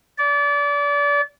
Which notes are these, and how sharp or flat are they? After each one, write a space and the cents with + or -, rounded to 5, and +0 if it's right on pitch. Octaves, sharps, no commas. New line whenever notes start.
D5 -30